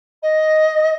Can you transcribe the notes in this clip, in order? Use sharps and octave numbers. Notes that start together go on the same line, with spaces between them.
D#5